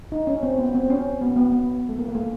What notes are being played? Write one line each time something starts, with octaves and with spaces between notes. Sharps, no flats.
D#4
C#4
C4
B3
C4
C#4
B3
B3
B3
A3
A#3
A#3
A3